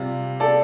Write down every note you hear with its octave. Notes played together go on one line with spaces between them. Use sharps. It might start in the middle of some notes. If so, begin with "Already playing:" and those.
Already playing: C3 G3 F4 D5
A4 D5